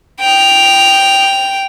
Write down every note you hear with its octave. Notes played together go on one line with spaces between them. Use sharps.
G5 F7